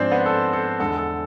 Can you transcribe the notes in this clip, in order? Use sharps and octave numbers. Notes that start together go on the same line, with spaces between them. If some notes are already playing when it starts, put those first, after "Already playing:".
Already playing: G#2 F3 G#3 C4 D4 C5 D5
B3 B4
A4
A4
E2 D3 G#3 A4
A4